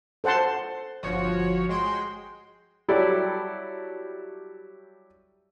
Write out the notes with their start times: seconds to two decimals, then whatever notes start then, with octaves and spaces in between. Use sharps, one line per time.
0.24 A4 C5 F#5 A5 C6
1.03 G1 F3 F#4 C#5
1.69 G#3 F#4 G5 C6
2.88 F#3 G3 E4 G4 A4 D5